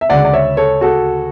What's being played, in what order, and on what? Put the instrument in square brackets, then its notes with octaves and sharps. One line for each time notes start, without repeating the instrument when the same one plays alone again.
[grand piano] E5
D2 C#3 G#3 D5 F#5
D5
C#5 E5
A4 C#5
F#4 A4